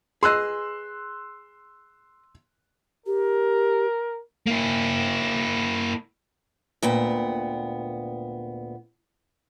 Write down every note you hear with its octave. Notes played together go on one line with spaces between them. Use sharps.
G#4 B4 D#5 C6 E6 F#6
G4 A#4
A#3 E4
D2 A#2 B3 G5